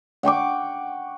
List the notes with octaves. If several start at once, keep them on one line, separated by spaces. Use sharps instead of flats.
F#5 G5 C#6 D6